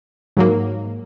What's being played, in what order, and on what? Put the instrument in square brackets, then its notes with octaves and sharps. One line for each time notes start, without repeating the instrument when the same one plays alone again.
[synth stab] G#2 F#3 A#3